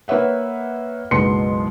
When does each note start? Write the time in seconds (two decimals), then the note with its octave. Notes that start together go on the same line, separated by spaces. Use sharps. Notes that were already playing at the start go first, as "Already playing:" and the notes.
0.08 A#3 B4 C#5 E5 F#5
1.11 F#1 B1 G#3 B3 C6 C#7